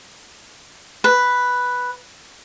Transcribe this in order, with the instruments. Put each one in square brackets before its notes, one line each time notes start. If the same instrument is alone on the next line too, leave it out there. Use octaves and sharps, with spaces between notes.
[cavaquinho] B4